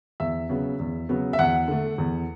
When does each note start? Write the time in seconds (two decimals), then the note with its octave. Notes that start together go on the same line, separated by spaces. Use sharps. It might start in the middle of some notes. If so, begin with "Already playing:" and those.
0.20 E2 E5
0.49 C#3 F#3 B3
0.79 E2
1.09 C#3 F#3 B3
1.33 E5
1.39 E2 F#5
1.68 D3 A3
1.98 E2